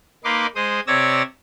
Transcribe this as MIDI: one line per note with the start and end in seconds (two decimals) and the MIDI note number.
0.24 0.47 58
0.24 0.47 63
0.24 0.47 71
0.24 0.47 84
0.24 0.47 86
0.56 0.80 56
0.56 0.80 72
0.56 0.80 87
0.87 1.22 48
0.87 1.22 73
0.87 1.22 74
0.87 1.22 88
0.87 1.22 92
0.87 1.22 94